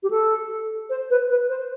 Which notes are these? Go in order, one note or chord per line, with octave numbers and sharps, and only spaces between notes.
G4
A4
C5
B4
B4
C5